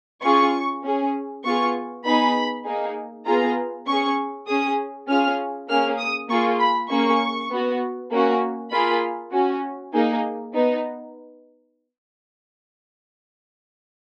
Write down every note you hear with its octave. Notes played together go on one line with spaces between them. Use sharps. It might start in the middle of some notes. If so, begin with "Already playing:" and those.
C#4 F4 G#4 C#6
C#4 G#4
B3 F4 G#4 C#6
B3 D#4 G#4 B5
A#3 D#4 G#4
B3 F4 G#4 A#5
C#4 G#4 C#6
C#4 G#4 D#6
C#4 F4 G#4 F6
A#3 C#4 G#4 F6
D#6
A#3 F4 G#4 C#6
B5
A#3 C#4 G#4 C#6
B3 F#4
A#3 C#4 F#4
A#3 F4 G#4 B5
C#4 F#4
A#3 D#4 G#4
B3 D#4